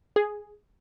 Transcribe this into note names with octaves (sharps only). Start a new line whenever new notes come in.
G#4